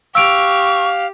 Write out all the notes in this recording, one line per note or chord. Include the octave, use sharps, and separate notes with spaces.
G4 F5 C#6 E6 D7 F7